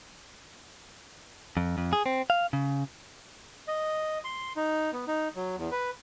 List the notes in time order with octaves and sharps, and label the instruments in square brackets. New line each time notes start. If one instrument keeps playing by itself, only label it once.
[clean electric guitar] F2
F2
G#4
C4
F5
C#3
[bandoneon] D#5
C6
D#4
B3
D#4
F#3
E2
B4